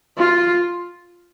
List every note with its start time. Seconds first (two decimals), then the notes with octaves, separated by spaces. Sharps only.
0.18 F4